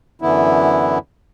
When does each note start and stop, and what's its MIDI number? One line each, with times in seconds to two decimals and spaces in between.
0.22 0.98 42
0.22 0.98 50
0.22 0.98 52
0.22 0.98 59
0.22 0.98 64